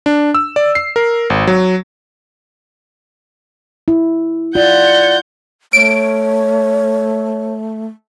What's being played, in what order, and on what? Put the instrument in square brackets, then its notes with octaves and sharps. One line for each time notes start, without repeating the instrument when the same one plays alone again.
[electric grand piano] D4
E6
D5
C7
A#4
G#1
F#3
[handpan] E4
[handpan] F4 [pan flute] D5 [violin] F#5 G6
[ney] A3 [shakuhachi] C#5 [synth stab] D7